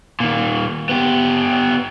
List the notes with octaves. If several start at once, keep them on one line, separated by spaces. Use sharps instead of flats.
A#2 D#3
B3 G4